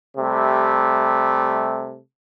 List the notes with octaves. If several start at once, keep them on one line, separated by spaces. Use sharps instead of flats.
C3 G3 A3